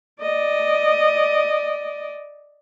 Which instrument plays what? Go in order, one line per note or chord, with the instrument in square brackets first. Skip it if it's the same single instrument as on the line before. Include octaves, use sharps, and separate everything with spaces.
[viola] D5 D#5